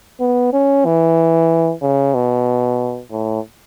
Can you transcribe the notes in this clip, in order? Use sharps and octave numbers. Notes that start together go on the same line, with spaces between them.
B3
C#4
E3
C#3
B2
A2